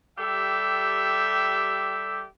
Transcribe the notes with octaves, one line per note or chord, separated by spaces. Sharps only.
G3 G4 A4 E5